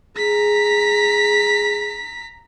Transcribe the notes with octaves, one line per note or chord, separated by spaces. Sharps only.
G#4 A#5 B6